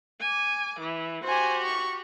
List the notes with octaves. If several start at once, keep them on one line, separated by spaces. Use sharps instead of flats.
G#5 D6
E3
F#4 G4 C5 G#5
C#6